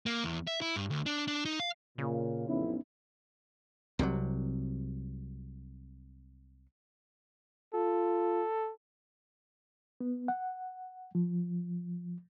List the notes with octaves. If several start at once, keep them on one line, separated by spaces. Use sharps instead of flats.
A#3
E2
E5
E4
G2
D2
D4
D4
D#4
F5
A#2 C#3
A1 F2 B3 C#4 D#4 E4
C2 C3 E3 F#3
F4 A4
B3
F#5
F3